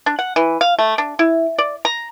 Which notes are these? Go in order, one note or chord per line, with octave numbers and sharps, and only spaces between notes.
D4
F#5
E3
F5
A3
D4
E4
D5
A#5